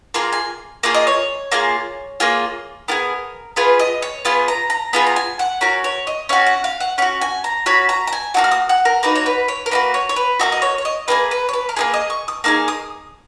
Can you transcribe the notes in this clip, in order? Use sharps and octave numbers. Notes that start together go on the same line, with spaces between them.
A#3 F4 G#4 A#5
G#5
A#3 F4 G#4 C#5
D#5
C#5
A#3 F4 G#4
A#3 F4 G#4
B3 F4 G#4 A#4
B3 F4 G#4 B4
D#5
C#5
B3 F4 G#4 B4
A#5
A#5
B3 F4 G#4 B5
A#5
G#5
F#5
C#4 F#4 A#4
C#5
D#5
C#4 F#4 F5
F#5
F5
F#5
C#4 F#4 F#5
G#5
A#5
C#4 F#4 B5
A#5
A#5
G#5
A#3 D#4 F#4 F#5
F6
D#6
F#5
A#4
A#3 D#4 F#4 B4
C#5
B4
C#5
A#4
A#3 D#4 F#4 B4
C#5
C#5
B4
A#3 D#4 F#4
D#5
C#5
C#5
D#5
A#3 D#4 G#4 B4
B4
C#5
B4
A#4
A#3 D#4 G#4 B4
D#5
C#6
D#6
A#3 D#4 G#4 F6
D#6